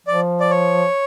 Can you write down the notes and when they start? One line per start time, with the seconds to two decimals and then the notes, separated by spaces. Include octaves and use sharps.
0.07 F3 D5
0.40 D5
0.50 C#5